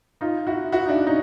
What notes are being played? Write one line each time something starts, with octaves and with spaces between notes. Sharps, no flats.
D#4 F4
E4 F#4
E4 F#4
D#4
D4 E4
C#4 D#4